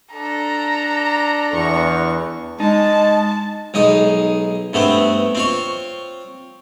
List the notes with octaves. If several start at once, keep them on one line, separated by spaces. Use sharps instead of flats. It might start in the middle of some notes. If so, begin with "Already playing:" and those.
D4 A4 A#5
E2 C#6
G#3 D#4 A5
B1 G#3 D#4 D#6
G2 A3 B3 C4
C4 F4 C#5